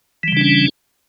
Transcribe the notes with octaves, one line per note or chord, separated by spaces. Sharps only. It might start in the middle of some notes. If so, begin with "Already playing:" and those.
C#3 E3 G3 C#4 D4